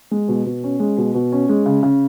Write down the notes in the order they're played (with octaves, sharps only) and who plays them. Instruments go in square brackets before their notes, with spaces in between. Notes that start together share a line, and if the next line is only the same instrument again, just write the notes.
[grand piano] G#3
B2
B2
C#4
G#3
B2
B2
C#4
G#3
C#3
C#3